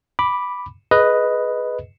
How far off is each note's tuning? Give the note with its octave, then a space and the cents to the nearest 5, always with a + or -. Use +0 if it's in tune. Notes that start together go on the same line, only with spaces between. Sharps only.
B5 +0 D6 +0
G#4 +20 B4 +0 D#5 +0